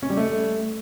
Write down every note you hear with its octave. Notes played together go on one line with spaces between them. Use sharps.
C#4
G3
A3